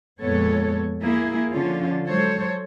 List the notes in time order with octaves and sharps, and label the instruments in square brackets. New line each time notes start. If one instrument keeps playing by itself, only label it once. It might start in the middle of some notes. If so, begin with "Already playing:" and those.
[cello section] F2 A#2 G#3 B3 A4 C#5
A#3 E4 G#4
D3 F3 C#4 F4
F#3 G#3 A4 C5 C#5